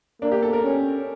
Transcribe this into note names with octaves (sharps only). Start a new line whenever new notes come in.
A#3 D4
G4
A4
A#4
C#4